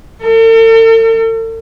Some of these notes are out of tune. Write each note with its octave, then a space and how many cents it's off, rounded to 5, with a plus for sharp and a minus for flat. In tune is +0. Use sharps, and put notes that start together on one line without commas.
A4 +45